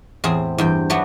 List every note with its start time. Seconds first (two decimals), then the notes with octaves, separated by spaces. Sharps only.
0.24 E2 A2 C4 G#4
0.58 E2 G2 G5
0.90 F#3 G3 A3 B3 D4 F#4